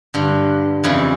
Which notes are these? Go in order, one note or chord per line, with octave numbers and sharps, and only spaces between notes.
G2 D3
F2 C#3 E3